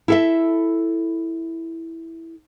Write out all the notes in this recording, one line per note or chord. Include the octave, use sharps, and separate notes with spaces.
E4 A4 E5